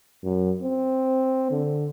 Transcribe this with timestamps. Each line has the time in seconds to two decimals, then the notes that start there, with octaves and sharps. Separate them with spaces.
0.23 F#2
0.62 C4
1.51 D3